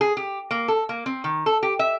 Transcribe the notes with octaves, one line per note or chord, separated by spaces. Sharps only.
G#4
G4
A#3
A4
A#3
C4
D#3
A4
G4
E5